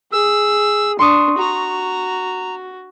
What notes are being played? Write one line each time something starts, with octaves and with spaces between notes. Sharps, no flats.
G#4 E6
D4 C6 C#6 D#6
F#4 A#5